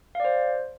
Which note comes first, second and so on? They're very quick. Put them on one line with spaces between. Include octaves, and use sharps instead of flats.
F5 D5 C5